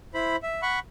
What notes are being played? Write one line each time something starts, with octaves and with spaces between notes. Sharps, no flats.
E4 C5 B5
E5
F#5 B5 C#6